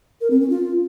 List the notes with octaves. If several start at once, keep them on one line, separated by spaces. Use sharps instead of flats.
A#4
C4
C#4
F4